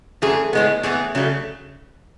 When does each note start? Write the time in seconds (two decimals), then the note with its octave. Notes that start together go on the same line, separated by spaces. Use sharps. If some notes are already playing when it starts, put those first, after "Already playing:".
0.22 F#2 E3 A3 G#4
0.53 A2 G#3 B3
0.83 A2 E3 B3 G#4
1.15 C#3 F#3 A3